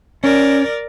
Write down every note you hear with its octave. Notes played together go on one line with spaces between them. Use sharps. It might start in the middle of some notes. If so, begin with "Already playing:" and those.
C#4 A#4 D5